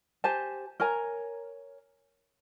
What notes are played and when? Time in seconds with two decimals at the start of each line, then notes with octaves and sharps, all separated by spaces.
0.24 G4 C5 G#5 A5
0.80 A#4 C#5 G#5 A#5